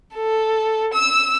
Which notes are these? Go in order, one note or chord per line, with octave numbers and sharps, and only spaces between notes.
A4
E6